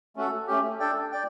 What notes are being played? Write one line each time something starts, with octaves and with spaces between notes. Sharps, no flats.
A3 C#4 F#4 A4
A3 C#4 G4
D4 A4 D5 G5
D5 G5